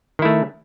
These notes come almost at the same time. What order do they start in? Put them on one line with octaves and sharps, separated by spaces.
D#3 E4 A3